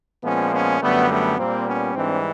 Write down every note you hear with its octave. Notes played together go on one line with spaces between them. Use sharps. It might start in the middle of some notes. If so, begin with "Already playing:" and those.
A#2 F3 G#3 B3 C#4
B3 C#4
F#2 D3 G3 A3 B3
A3 B3
A#2 G3 A#3 C4
B3 C#4
G#2 E3 G3 C4 D4